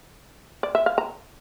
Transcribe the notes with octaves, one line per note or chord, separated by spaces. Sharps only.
D5
E5
F5
A#5